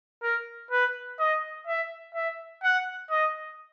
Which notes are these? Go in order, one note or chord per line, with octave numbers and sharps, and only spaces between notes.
A#4
B4
D#5
E5
E5
F#5
D#5